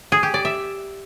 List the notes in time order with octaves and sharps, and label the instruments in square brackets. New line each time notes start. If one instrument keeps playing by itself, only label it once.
[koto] G#4
G4
D5
E5